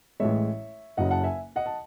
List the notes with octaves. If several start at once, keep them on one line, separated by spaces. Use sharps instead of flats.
A1 A2 G#3 C#5 E5
F#1 F#2 C#3 D#5 F#5
F#5 A5
E5 G#5
D#5 F#5
A5